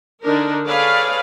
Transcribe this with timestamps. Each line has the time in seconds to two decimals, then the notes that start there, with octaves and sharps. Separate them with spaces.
0.23 D3 D4 D#4 A#4
0.65 G#4 A4 B4 C#5 D5 F5